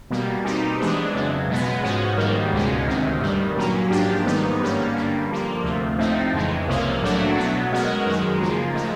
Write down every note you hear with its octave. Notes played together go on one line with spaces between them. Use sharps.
B2 G3 A#3
B2 G3 C4 D#4 G4
E3 G#3 B3 D4
F2 C#3 F#3
B2 G#3 B3
G#2 F3 G#3 C#4 F#4
G#2 D#3 G3 A#3
C#2 B2 G#3 C#4
D2 C3 D#3
G2 D#3 G3
A#2 F#3 A#3 C#4
G#2 F3 A#3 D4 G4
G#2 D#3 G3 B3 D#4
G2 D3 G3 A#3 C#4
G2 D3 G3 A#3
D3 F3 A#3
D2 C3 F3 A3
A2 F3 A3 C4 D#4
F2 C#3 E3 G#3
C2 C3 F3 A#3 C#4
A2 F#3 A3 D4 F#4
B2 F#3 B3
B2 G#3 C#4 F#4 A#4
F#2 D#3 G#3
C#3 F3 A#3
A2 F3 G#3